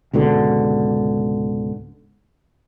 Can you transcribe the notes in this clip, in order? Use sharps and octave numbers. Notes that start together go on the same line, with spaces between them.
C#2 G#2 B2 D3